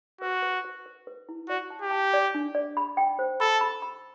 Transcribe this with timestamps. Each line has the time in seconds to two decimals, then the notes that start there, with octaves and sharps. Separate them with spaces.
0.21 F#4 B4
0.43 B4
0.64 B4
0.86 B4
1.07 B4
1.29 E4
1.49 F#4 D5
1.70 A5
1.82 G4
1.91 A5
2.13 D5
2.35 D4
2.55 D5
2.77 B5
2.97 G5
3.19 C5
3.40 A4 B5
3.61 B5
3.82 B5